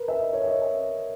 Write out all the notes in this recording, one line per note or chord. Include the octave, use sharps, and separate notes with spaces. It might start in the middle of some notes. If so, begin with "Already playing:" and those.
Already playing: A#4 B4
E5
D#5
C#5
E5
D#5
E5